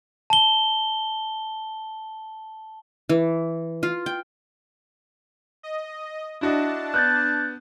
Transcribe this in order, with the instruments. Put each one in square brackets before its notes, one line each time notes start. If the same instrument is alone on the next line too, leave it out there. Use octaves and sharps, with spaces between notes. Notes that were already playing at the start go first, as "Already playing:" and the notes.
[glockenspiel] A5 G7
[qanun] E3
F4
G5
[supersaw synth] D#5
[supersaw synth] D4 A5 [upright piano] E4 F#4 D#5
[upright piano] B3 [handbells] F#6 G6 A6